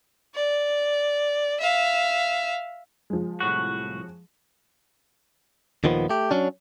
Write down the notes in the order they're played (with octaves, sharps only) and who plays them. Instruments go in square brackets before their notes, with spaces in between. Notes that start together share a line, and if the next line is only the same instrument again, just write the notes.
[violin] D5
E5 F5
[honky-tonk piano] F3 G#3
[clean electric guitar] C2 A2 F#4
D#2 A#2 D#3 F3 B3
A3 G4
F#3 C#4 D4